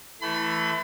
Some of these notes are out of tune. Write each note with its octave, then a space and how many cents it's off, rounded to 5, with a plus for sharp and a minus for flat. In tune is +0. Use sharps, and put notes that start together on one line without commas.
E3 +0 A3 +0 B5 +40